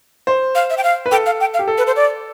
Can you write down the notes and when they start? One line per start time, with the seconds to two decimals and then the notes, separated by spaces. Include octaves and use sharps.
0.27 C5
0.55 F5
0.70 E5
0.77 G5
0.84 F5
1.06 B4
1.11 A4 G5
1.26 F5
1.40 G5
1.54 F5
1.59 G4
1.68 A4
1.78 B4
1.87 C5
1.96 D5